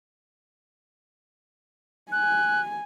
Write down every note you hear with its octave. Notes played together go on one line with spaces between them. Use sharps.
G#5 F#6